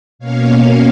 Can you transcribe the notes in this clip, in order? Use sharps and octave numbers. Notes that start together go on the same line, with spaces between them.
B2 A#3 C#4 C#5 F5
C#5 F5